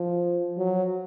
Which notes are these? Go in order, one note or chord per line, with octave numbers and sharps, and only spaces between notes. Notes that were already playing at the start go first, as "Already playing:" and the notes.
Already playing: F3
F#3